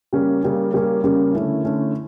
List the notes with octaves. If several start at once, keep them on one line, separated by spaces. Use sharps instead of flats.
C#3 G3 A#3 C#4
C#3 G3 A#3 C#4
C#3 G3 A#3 C#4
C#3 G3 A#3 C#4
D3 A3 C#4 E4
D3 A3 C#4 E4